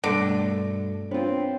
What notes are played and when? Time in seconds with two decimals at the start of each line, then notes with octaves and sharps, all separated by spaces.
0.04 G2 B2 D3 A3 A#6
1.11 B3 C4 D4 F4 C5 C#5